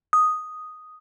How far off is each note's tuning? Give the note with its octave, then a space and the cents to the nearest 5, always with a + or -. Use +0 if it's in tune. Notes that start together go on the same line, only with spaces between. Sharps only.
D#6 +0